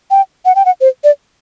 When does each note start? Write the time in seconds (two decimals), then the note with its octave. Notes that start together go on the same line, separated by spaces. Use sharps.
0.11 G5
0.45 F#5
0.55 G5
0.66 F#5
0.81 C5
1.04 D5